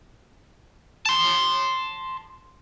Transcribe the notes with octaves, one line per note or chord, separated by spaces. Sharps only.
A5 C6